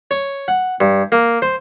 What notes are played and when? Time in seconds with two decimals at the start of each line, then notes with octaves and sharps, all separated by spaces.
0.11 C#5
0.48 F#5
0.81 G2
1.12 A#3
1.42 C5